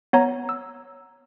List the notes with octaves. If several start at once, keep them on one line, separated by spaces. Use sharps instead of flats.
B3 C#5 A#5
E6